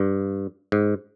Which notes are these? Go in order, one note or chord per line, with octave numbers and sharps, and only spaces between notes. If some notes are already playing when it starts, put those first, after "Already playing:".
Already playing: G2
G#2